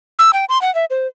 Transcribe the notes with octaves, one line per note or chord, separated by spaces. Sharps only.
E6
G5
C6
F#5
E5
C5